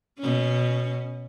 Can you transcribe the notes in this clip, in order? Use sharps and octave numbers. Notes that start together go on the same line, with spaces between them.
B2 C#4